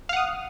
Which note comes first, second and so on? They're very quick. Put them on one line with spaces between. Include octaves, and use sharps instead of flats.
F5 F#5 D#6